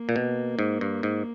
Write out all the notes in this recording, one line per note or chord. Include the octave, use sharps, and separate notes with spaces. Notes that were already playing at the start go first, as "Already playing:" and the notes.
Already playing: A#3
A#2
B2
G#2
G2
G#2